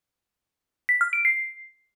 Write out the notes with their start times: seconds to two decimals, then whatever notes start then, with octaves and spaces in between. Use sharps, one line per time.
0.89 B6
1.01 F6
1.13 D7
1.25 C7